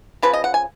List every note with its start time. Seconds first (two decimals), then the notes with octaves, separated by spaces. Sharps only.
0.23 C#3 F3 B4
0.33 D#5
0.44 F#5
0.54 G#5